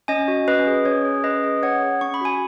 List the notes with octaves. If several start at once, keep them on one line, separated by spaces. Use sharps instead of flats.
C#4 D#5 G#5
F#4
C#4 B4 D#5
G#4
C#4 C#5
G#4
C#4 B4 D#5
G#4
C#4 C#5 F#5
G#4
C#4 C#6
B5
F#4 G#5